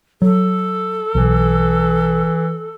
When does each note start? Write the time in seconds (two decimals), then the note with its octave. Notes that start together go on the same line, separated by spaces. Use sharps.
0.22 F#3 A4
1.15 B1 E3